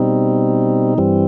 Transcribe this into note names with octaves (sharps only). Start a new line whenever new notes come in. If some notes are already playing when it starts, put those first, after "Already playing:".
Already playing: B2 G3 C4 D#4
G2 E3 G3 C4